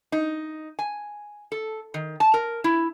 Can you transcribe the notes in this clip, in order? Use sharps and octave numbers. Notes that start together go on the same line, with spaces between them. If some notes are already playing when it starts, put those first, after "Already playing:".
D#4
G#5
A4
D#3
A5
A#4
E4